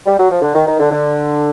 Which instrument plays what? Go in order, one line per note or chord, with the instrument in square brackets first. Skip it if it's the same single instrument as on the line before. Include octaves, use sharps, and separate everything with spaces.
[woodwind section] G3
F#3
F3
D3
D#3
D#3
D3
D3